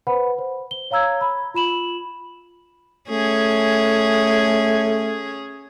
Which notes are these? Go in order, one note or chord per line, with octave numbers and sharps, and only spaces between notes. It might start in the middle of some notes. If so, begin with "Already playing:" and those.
B4 C5 F#5 B5
C5
G7
C#5 F5 A#5 E6 G#6
B5
F4 B5 E7 F#7
A3 C#4 G#4